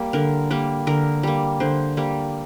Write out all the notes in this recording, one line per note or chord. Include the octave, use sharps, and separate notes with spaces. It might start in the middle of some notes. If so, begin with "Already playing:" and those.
Already playing: G3 A#3
D3 A#4
G3 A#3
D3 A#4
G3 A#3
D3 C5
G3 A#3